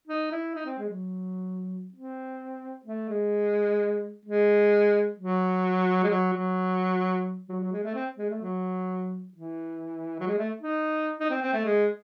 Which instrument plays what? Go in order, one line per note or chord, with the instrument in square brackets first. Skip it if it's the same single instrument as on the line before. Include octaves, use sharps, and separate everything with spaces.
[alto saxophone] D#4
E4
D#4
C4
G#3
F#3
C4
A3
G#3
G#3
F#3
G#3
F#3
F#3
F#3
F#3
G#3
A3
C4
G#3
A3
F#3
E3
F#3
G#3
A3
D#4
D#4
C4
C4
A3
G#3